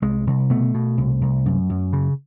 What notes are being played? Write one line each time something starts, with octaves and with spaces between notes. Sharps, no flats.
C2 G#3
C2
B2 A3
B2
C2
C2
F#2
F#2
C#3